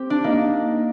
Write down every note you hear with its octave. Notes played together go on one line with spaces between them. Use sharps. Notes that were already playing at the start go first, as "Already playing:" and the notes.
Already playing: C4 G4
D4
A#3 D#4